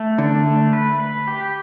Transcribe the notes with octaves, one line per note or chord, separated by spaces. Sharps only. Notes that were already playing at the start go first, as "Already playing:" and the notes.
Already playing: A3
D3 D4
A3
B4
B4
G4